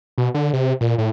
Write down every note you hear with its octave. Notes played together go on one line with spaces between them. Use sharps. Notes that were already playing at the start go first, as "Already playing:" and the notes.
B2
D3
C3
A#2
A2